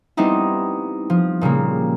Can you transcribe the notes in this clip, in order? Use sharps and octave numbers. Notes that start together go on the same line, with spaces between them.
G3 B3 C4 D#4 E4
F3
A#2 C#3 G3 A#3